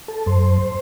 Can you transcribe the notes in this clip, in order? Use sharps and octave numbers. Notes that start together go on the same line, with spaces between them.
A4
F#2 C5